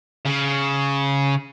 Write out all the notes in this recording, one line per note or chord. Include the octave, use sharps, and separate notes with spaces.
C#3